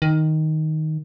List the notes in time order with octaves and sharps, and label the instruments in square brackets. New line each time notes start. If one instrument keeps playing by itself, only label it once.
[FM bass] D#3